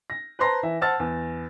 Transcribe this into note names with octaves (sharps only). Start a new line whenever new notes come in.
A#6
B4 C5 A5 A#5 C6 A#6
E3 E5
C5 F#5 A5 E6 F6 A6
E2